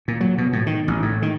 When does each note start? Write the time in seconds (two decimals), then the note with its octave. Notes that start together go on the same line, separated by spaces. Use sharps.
0.08 A#2
0.21 F#3
0.38 B2
0.53 A2
0.67 D#3
0.88 A1
1.02 A2
1.22 D#3